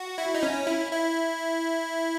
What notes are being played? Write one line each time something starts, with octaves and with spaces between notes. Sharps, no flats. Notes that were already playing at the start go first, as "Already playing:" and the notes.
Already playing: F#4
E4
D#4
C#4
E4
E4